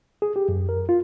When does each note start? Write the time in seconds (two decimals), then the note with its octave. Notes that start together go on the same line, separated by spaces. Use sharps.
0.22 G#4
0.36 G4
0.49 F#2
0.69 A#4
0.89 F4